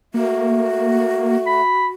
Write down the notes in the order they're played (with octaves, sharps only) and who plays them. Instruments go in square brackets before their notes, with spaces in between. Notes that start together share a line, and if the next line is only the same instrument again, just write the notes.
[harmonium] A3 [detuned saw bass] A#3 [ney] F#4
[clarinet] B5